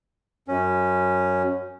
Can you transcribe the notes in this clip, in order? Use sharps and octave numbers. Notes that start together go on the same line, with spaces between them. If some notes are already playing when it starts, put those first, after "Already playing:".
F#2 C#4